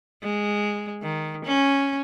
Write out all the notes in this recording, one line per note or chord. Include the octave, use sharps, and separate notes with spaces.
G#3
D#3
C#4